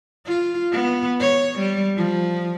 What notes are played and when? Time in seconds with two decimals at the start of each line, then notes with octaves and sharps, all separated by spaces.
0.26 F4
0.72 B3
1.20 C#5
1.59 G3
1.97 F3